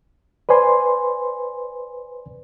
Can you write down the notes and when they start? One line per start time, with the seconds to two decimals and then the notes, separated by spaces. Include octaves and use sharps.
0.49 B4 C5 D5 G#5 C6